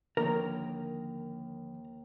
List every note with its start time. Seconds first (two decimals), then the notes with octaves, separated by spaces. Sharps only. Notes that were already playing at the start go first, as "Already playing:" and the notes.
0.17 D#2 D3 F3 A#3 A#4 C#5 A#5